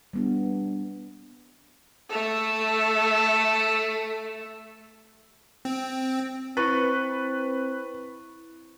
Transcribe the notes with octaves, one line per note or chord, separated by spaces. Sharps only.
G3 B3 D4
A3 A4
C4
C4 E4 B4 C#6 A6